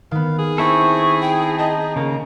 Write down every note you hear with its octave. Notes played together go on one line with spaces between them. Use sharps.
D#3 B3 F5
G#4
C4 E4 A4 C#6
G5
D#5 A5 A#5 G6
C#3 A#3